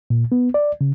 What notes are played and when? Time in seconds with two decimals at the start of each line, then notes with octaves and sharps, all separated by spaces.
0.10 A#2
0.32 B3
0.54 D5
0.81 C#3